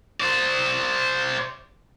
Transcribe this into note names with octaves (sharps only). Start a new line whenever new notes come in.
C5 D5